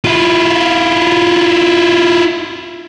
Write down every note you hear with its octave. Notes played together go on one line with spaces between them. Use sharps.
E4 F4